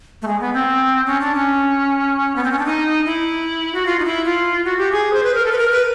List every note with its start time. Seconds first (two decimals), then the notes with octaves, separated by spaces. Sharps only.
0.22 A3
0.27 G#3
0.41 B3
0.54 C4
1.06 C#4
1.21 D4
1.35 C#4
2.36 B3
2.44 C4
2.51 C#4
2.59 D4
2.66 D#4
3.06 E4
3.75 F#4
3.86 F4
3.99 D#4
4.05 E4
4.25 F4
4.65 F#4
4.78 G4
4.92 G#4
5.13 C5
5.23 B4
5.35 A#4
5.45 A4
5.52 B4
5.58 A#4
5.71 B4